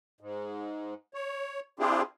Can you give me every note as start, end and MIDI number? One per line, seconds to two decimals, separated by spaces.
0.21 0.94 44
1.14 1.60 73
1.79 2.02 60
1.79 2.02 62
1.79 2.02 64
1.79 2.02 65
1.79 2.02 67
1.79 2.02 68